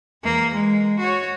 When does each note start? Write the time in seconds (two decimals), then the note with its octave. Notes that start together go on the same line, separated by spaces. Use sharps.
0.24 E2 A#3
0.55 G#3
0.99 F#4 C#5